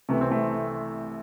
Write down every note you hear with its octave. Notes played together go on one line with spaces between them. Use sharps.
C2 C3 E3 A3
C4
A3